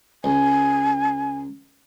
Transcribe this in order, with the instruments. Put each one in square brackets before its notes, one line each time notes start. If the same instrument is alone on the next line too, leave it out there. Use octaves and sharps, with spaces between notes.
[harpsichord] C#2 [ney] G#5